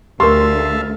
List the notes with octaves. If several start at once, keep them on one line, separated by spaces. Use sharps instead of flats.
D2 G4 A#4 E5 F5 A5 C6